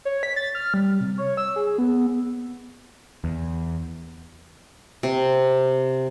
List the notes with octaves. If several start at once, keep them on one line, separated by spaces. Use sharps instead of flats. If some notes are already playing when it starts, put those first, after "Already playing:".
C#5
B6
A6
F6
G3
C3
C#5
E6
G#4
B3
E2
C3